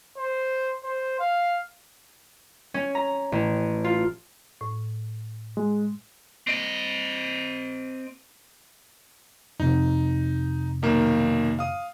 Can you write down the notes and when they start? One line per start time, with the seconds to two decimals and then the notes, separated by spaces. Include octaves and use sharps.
0.17 C5
0.84 C5
1.20 F5
2.74 C#4
2.95 A#5
3.32 A1
3.84 F4
4.61 A2
5.57 G#3
6.47 C4 D#5
9.60 F2 C3 D#4
10.83 B1 D#3 A#3
11.59 F5 D#6